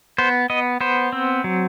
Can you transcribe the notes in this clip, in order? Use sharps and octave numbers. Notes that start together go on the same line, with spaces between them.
B3 C5
B3 D#5
B3 C5
C4
F#3